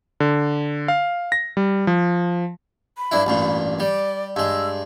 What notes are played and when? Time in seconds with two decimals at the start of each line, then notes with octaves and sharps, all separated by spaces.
0.20 D3
0.88 F5
1.32 A#6
1.57 G3
1.87 F3
2.98 B5
3.11 G2 D4 E4
3.26 A1 G2 A#2
3.80 G3 D5
4.36 G2 G#3 E6